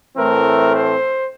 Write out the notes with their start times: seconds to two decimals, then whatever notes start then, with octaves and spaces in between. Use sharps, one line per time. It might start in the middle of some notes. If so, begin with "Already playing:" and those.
0.16 A2 E3 A3 C4 A#4
0.72 C5